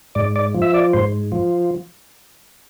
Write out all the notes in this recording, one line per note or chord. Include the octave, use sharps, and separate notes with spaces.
G#2 D5
D5
F3
E5
D5
G#2 C5
F3